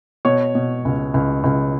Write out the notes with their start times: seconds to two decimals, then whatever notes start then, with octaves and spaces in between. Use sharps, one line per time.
0.25 B2 C#5
0.55 B2
0.85 C#2
1.14 C#2
1.44 C#2